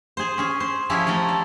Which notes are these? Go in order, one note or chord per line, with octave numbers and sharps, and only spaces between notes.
G#4 C5
C#4 G#4
C5
F3 C#4 E4 G4 G#4
F3 A3 A4 A#5
D5